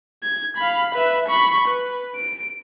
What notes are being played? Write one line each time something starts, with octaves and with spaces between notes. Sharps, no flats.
G#6
F5 B5
B4 E5
B5 C#6
B4
D7